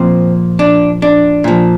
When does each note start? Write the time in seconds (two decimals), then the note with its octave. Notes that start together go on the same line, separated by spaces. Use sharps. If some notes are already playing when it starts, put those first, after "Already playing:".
Already playing: A#2 F3 C4
0.59 D4
1.02 D4
1.44 A#2 F3